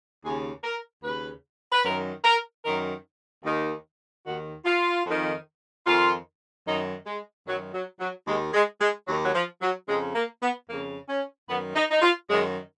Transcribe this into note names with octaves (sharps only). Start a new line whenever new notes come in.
D#2 C#3 G#4
A#4
D#2 C#3 B4
B4
F#2 D#3 A#4
A#4
F#2 D#3 A#4
D#2 D#3
D#2 D#3 F#4
F4
F2 D#3
F2 D#3 F4
F#2 D#3 D#4
G#3
F#2 D#3 F#3
F#3
F#3
D#2 D#3 G#3
G#3
G#3
D#2 D#3 F#3
F#3
F3
F#3
F2 C#3 G#3
A#3
B3
F2 C#3 A#3
C#4
F#2 D#3 B3
D#4
D#4
F4
F#2 D#3 G#3